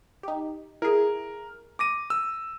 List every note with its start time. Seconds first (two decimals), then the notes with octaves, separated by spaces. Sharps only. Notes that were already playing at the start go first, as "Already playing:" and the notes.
0.23 D#4 G4
0.82 E4 G#4 A#4
1.79 D6 A#6 D#7
2.10 E6